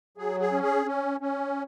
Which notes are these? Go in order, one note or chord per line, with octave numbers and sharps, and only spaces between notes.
F#3 G#4
G#4
C#4
G#4
C#4
C#4